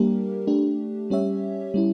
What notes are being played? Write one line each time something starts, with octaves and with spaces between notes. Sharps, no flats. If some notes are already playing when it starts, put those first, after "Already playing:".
Already playing: G3 A#3 D4 G4 A#4
A3 D4 G4
G3 C#4 G4 C#5 E5
G3 C#4 E4